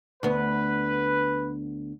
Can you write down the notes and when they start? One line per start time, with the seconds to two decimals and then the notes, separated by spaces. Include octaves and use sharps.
0.23 D2 B3 B4